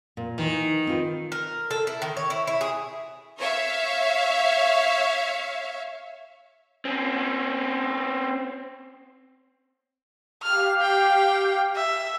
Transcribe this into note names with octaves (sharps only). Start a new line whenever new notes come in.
A#2
D#3 E3 A#4
C4 F4 B4
A#4
A4
E4
D#3
C#5
E4
E4
G#4
C#5 E5 F5
C4 C#4
G4 F5 F6
G5
E5